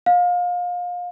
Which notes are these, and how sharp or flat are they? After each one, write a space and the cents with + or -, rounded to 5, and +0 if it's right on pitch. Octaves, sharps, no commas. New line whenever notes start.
F5 +30